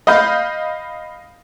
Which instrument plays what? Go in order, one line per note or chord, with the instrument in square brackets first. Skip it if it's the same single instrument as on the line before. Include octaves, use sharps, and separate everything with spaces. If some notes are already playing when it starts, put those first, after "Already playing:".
[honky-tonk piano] D#5 F5 B5 G6